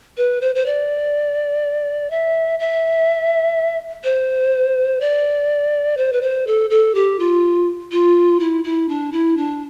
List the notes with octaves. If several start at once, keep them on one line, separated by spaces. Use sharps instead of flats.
B4
C5
C5
D5
E5
E5
C5
D5
C5
B4
C5
A4
A4
G4
F4
F4
E4
E4
D4
E4
D4